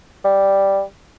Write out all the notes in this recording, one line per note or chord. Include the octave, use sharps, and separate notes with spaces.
G3